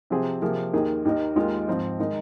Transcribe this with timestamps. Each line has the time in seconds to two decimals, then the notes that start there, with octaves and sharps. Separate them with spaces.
0.10 C3 F3 C4 G#4
0.42 C3 F3 A#3 G#4
0.73 D#2 D#3 A#3 D#4 G#4
1.05 D#2 D#3 A#3 D#4
1.36 D#2 D#3 G#3 F4
1.68 G#2 F3 C4 D#4
2.00 D#3 G#3 D#4